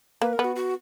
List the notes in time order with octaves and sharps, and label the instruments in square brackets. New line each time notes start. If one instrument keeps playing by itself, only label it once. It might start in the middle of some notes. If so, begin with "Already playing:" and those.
[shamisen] A#3 [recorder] B4
[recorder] A#4
[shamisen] B3
[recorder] F#4
F#4